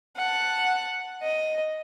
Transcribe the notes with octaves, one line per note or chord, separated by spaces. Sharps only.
F#5 A5
D#5